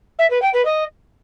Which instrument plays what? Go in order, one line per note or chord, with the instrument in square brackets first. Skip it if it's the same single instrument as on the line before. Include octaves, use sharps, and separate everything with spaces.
[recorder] E5
B4
G5
B4
D#5